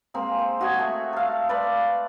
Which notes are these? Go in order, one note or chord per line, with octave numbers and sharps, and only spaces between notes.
G#3 A#3 C4
C5
F#4 G#4 D#5 G#5
A3
A4 F5
B4 D5 F5